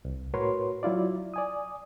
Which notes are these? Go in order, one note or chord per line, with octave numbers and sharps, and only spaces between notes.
C2
A2 F#4 A#4 B4 C#5 C6
F#3 E4 F4 D5
D5 G#5 D#6